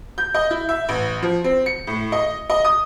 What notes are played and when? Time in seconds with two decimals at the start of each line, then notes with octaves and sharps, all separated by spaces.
0.18 G6
0.34 D#5
0.51 E4
0.69 E5
0.89 A1
1.22 F3
1.44 C4
1.66 C#7
1.87 A2
2.12 D#5
2.50 D#5
2.65 D#6